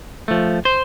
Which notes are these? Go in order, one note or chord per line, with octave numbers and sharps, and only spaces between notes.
F3 A3
C5